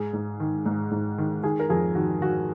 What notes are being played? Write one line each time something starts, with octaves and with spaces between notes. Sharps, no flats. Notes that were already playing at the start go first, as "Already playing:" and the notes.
Already playing: G#2 G#4
G#2
D#3
G#2
G#2
D#3
D#3 G#4
A#4
F2 G#4
D#3 F#4
D#3 F#4